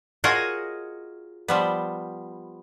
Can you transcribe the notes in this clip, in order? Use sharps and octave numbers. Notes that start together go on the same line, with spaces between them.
F4 F#4 G#4 A#4 C#5 D#5
F3 G3 B3